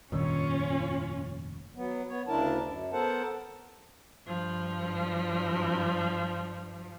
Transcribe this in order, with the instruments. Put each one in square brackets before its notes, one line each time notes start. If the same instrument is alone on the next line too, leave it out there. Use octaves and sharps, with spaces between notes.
[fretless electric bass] F1 G2 A#2 [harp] D#3 E6 [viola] C#4 F4 [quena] C#5
[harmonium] F#3 B3
B3 C#5
D2 C#3 D4 E4 A#4 A5
F#2
B3 A4 A#4 C5 F#5 A5
[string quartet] G2 F3